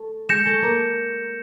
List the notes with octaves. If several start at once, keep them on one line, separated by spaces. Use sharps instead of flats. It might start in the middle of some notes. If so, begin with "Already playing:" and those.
Already playing: A3 A4
G#3 G#4 G6 A#6 C#7 E7
A3 A4
A#3 A#4